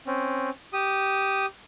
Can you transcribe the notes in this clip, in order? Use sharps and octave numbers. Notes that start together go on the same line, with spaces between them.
C4 C#4
G4 D#6